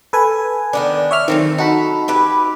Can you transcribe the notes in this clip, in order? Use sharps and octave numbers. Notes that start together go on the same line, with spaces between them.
A4 B4 G#5
D#3 B3 D4
C#5 E5 F6
D#3 F#3 A3 C4
D#4 F#4 A4 B5
E4 G4 B4